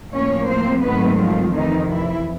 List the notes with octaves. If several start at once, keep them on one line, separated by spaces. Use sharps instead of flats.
A2 F3 A#3 C#4 C#5
C4 C5
G#2 D#3 F#3 A3 B3 C4 B4
F3 F4
F2 C3 D#3 E3 D#4
E3 E4